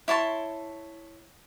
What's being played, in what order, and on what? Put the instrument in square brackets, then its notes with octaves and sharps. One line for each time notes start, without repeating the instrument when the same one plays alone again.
[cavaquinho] E4 C#5 A5 C6